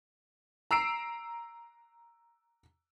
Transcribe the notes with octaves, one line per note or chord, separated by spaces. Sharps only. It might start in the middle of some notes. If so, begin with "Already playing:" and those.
A#5 E6 C7 D7